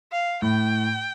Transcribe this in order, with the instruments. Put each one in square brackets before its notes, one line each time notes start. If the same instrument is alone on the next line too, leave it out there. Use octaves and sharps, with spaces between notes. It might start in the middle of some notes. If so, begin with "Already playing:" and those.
[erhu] F5
[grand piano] A2 [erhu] G5